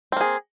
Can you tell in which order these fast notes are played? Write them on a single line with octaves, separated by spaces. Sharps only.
C4 A#3 G#4